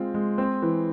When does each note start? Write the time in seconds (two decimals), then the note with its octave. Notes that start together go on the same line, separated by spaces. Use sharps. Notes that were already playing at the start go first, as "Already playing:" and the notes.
Already playing: G#3 C4 F4
0.14 G#3
0.38 C4
0.62 E3